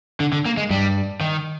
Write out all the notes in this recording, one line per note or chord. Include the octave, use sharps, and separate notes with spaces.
D3
D3
A#3
G#3
G2 G3
D#3